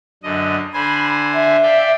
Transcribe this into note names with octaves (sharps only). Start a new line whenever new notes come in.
F#2 D3 D#5
D3 C5 G#5 B5
E5
D5 F5 G5